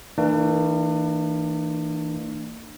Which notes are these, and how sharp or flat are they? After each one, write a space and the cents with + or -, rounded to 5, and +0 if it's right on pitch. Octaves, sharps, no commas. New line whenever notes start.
E3 -25 A#3 -40 D4 +35